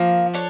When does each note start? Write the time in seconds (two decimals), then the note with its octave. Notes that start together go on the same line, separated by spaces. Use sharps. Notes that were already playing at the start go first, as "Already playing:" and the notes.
Already playing: F3 A#3
0.34 D4 A4 C#5